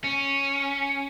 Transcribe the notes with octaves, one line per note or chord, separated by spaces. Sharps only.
C#4